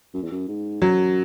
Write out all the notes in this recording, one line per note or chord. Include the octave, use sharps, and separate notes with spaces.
F#2
E2
F#2
G#2
F#2 F#3